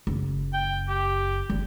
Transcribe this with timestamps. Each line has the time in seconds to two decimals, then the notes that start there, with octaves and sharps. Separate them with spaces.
0.07 F#1
0.54 G5
0.89 G4
1.50 G3 G#3